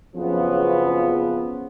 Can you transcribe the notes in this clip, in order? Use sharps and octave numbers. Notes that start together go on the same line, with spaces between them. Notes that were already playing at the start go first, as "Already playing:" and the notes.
F#1 F2 C#3 F3 B3